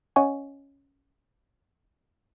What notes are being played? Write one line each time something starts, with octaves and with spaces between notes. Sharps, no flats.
C#4 C#5 D#5 F#5 G#5 C#6